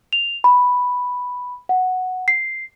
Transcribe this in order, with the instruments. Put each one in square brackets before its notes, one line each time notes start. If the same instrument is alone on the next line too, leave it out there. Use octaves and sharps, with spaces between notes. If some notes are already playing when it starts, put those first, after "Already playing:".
[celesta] F7
B5
F#5
C7